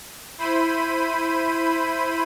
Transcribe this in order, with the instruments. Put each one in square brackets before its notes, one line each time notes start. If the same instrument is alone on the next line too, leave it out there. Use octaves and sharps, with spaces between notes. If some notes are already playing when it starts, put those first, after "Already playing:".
[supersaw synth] E4 C5 B5 D#7